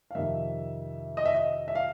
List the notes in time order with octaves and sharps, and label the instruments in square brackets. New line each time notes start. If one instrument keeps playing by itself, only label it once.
[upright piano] F5
F2 C3 D#3 E5
D#5
E5
D#5
E5
F5